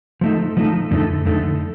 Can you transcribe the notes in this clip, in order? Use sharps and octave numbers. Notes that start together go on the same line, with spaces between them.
F3 A3 D#4 A4
F3 A3 D#4 A4
F2 D3 A3 D#4 A4
F2 D3 A3 D#4 A4